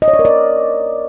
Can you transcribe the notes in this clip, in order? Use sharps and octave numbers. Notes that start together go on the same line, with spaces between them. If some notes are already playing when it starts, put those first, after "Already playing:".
D#5
C#5
D5
A#4
D5